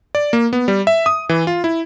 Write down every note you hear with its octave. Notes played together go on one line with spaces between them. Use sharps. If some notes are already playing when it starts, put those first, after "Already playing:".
D5
A#3
B3
G3
E5
D#6
E3
F4
E4